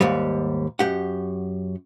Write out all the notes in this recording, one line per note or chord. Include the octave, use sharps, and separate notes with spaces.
D#2 G#2 G3
F#2 G4 F#5